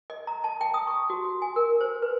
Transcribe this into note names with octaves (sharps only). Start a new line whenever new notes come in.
D#5
A#5
A5
G5
D#6
C#6
F#4
F#4
G#5
A#4
C5
B4